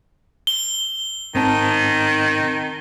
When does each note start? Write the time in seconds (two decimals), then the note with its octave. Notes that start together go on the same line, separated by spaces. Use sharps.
0.47 G7
1.35 G#2 D#3 C4 A5